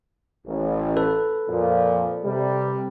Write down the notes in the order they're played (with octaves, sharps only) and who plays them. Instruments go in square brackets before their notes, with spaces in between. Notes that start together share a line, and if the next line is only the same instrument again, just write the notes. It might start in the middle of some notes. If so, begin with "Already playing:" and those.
[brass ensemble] A1
[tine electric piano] A4 B4
[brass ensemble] F2 A#2 F3
C3 G3